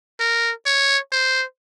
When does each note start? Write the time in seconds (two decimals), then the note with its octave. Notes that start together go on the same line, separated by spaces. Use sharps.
0.20 A#4
0.66 C#5
1.12 C5